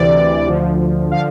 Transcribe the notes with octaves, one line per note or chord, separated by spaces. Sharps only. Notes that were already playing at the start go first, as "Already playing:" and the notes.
Already playing: D2 C3 E3 D5
D2 D3 F3
D3 F3 F5